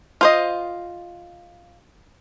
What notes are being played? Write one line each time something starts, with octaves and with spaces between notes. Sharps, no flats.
F4 C5 D#5